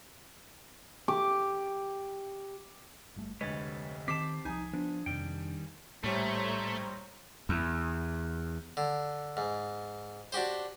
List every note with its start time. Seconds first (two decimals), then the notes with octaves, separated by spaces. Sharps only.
1.08 G4 D6
3.16 G1 G3 A3
3.41 F1 D2 G#3 B4 C#5 D#5 A6
4.08 D#3 C4 G4 A5 D6 B6 C7
4.45 C2 F3 D#4 G#5 D#6
4.73 F3 B3 D4
5.06 F2 C3 D#3 G3 G5
6.04 A#1 A2 G3 A3 C5 C#5 A#5
7.49 E2
8.77 D3
9.37 G#2
10.32 D4 F#4 G4 C5